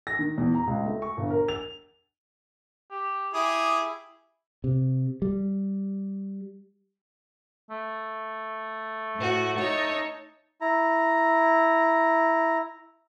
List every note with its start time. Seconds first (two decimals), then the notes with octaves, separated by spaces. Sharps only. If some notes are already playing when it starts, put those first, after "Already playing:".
0.07 A#6
0.19 D#3
0.38 E2
0.55 A#5
0.67 C#2
0.86 A3
1.02 C#6
1.17 G1
1.30 A#4
1.48 F7
2.91 G4
3.34 E4 G4 G#4 D#6
4.64 C3
5.22 G3
7.70 A3
9.17 A2 F#4
9.56 D#4 C#5 A5
10.61 E4 A#5